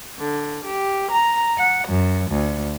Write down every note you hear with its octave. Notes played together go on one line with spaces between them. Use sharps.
D3
G4
A#5
F#5
F#2
D2